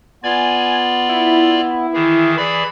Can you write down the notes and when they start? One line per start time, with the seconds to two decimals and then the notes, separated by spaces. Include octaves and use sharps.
0.24 B3 F4 D5 G#5
1.09 E4
1.94 D#3 E3 G#4
2.38 E3 G#4 D5 B5